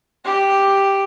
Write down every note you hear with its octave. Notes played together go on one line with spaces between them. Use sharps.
G4